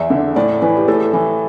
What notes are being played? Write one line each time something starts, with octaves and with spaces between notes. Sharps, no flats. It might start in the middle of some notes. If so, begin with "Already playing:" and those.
Already playing: E2 E5
D3
A2 D5
E3 B4
G4
A2 A4
E3